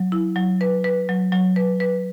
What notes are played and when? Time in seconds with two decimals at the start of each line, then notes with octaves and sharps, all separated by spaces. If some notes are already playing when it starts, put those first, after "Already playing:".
Already playing: F#3
0.12 E4
0.36 F#3
0.61 B4
0.84 B4
1.09 F#3
1.32 F#3
1.56 B4
1.80 B4